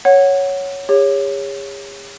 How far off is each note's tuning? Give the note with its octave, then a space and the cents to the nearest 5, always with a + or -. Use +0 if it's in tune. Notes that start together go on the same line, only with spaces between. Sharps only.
C#5 +0 F#5 +0
G#4 -45 C#5 +0